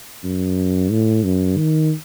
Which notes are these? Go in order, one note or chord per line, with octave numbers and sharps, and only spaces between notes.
F#2
A2
F#2
D#3